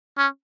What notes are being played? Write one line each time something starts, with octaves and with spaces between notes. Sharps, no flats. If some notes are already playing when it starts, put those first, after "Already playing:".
C#4